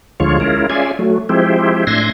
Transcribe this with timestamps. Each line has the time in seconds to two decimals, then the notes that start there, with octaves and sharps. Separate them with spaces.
0.20 D2 D3 F3 G#3 F4 C#5
0.40 G#3 C#4 E4 F4 A#4
0.70 C#4 F4 G#4 D5 E5 G#5
0.99 F#3 A3
1.29 F3 G#3 C4 E4 G4
1.87 A2 D4 E5 G#5 C6 A#6